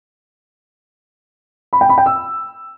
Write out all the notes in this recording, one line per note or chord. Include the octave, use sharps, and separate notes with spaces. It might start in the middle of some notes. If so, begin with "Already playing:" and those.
B5
G5
B5
G5
E6